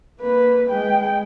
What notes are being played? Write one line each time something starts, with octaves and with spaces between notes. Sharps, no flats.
A#3 B4
G#3 G5